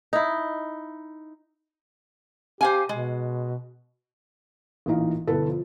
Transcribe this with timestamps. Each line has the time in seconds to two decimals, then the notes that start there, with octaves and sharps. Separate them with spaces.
0.13 D#4 E4
2.61 G4 C5 F5 G#5
2.89 B2 G#3
4.86 A1 A#2 E3 D#4 F5
5.27 G1 B2 E4 A4 B4
5.48 F3